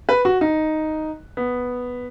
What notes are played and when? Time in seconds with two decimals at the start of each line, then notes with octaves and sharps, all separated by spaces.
0.09 B4
0.25 F#4
0.41 D#4
1.37 B3